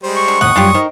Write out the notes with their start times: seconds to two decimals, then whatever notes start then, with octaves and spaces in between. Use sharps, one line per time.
0.03 G3 G#3 C5
0.16 C#6
0.28 D3
0.41 D#2 A2 C3 F#5 D#6
0.56 F#2 G3 D4 F4 G4
0.74 D#3 D#4 A#4 C5